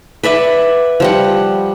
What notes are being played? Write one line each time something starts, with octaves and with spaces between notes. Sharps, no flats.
B4 D5 E5 F#5
F3 G3 F#5